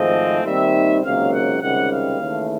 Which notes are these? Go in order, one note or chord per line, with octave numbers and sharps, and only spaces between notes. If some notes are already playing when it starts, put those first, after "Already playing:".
Already playing: G#1 G#2 F3 A3 C4 D#5
D#2 D#3 G3 C4 D#4 E5
C#2 C3 D#3 F#3 A#3 F5
F#5
C#2 C3 D#3 G3 F#5
F5
D#2 C#3 E3 A3